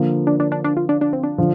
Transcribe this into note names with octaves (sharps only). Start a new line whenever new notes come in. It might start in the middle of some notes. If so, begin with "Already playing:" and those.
Already playing: D3 F3 A#3
D4
D4
D4
D4
F4
D4
D4
C4
D4
D3 F3